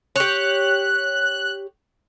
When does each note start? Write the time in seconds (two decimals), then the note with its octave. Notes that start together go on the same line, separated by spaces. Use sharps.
0.16 G4 C#5 F#6